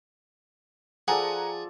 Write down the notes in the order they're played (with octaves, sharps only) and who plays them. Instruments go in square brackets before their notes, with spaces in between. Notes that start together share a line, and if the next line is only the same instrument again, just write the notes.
[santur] F3 A4 D5 [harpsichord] G#4 [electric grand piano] F#5 G#5 A#5